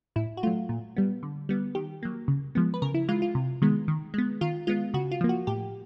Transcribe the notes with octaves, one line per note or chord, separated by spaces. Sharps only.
A2 E4
F#4
F#3 A3 F4
A#2
G3 B3
D3
G3 B3
D#3 G4
F#3 A#3
C#3
F3 G#3 B3
B4
C#3 A#4
E4
E3 G#3 F4
F4
C3
D#3 G#3 B3
D#3
G#3 B3
D#3 F4
G#3 B3 F4
C#3 F#4
F4
F3 A#3
F#4
A2 G4